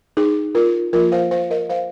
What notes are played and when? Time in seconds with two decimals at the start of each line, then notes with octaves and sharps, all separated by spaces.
0.17 D#4 G#4
0.55 F4 A#4
0.93 F3 A#3 F4 A#4
1.12 C5 F5
1.31 C5 F5
1.51 A#4 D#5
1.69 C5 F5